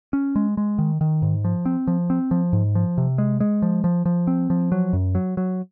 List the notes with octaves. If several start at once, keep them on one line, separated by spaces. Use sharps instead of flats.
C#4
G#3
G#3
D#3
D#3
G#2
F3
C4
F3
C4
F3
G#2
F3
C3
G#3
G#3
F3
F3
F3
C4
F3
F#3
F#2
F#3
F#3